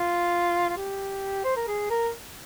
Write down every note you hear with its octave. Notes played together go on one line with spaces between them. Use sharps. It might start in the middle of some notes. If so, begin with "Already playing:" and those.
Already playing: F4
F4
G4
C5
A#4
G#4
A#4